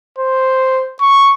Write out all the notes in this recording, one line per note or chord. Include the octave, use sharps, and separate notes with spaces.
C5
C#6